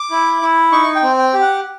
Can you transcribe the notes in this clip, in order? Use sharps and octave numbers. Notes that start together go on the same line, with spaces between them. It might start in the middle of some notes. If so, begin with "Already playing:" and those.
Already playing: D6
E4
E4
D#4 C#6
G5
C4
G5
G4
F#5